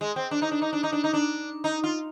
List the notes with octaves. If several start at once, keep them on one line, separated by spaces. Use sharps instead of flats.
G#3
C4
D4
D#4
D4
D#4
D4
D#4
D4
D#4
D4
D#4
F4